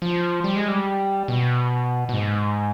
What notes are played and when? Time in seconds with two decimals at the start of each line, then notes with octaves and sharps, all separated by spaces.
0.02 F3
0.44 G3
0.56 G#3
0.68 G3
1.28 B2
2.09 B2
2.14 G#2